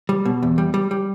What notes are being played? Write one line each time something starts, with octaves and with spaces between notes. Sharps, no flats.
G3
B2
E2
G3
G3
G3